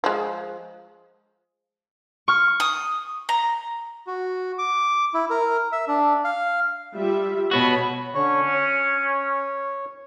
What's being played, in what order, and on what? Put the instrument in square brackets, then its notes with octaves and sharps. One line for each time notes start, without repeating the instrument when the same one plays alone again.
[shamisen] F3 G#3
[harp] C#6 F6
[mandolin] D#6
A#5
[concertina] F#4
D6
E4
A#4
E5
D4
F5
[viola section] G3 F4 E5
[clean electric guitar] B2 B3 F#4 [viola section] C#5 B5
[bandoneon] D3 C#5 C#6 [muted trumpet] C#4
[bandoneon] C#5